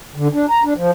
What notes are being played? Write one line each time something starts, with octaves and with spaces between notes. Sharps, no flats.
D3
D4
A#5
D4
F3